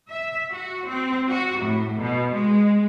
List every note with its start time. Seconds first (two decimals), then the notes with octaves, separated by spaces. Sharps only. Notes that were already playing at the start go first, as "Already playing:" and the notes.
0.10 E5
0.50 F#4
0.87 C4
1.30 F#4
1.61 A2
1.99 B2
2.35 G#3